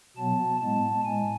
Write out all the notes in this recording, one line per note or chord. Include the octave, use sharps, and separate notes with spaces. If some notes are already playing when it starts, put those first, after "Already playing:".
B2 F#3 B3 A5
A2 G#3 B3 A5
A2 G#3 G#5